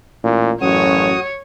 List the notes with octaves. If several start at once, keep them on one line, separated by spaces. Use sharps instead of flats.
A1 A#2
A1 F#2 F#4 C#5 D#6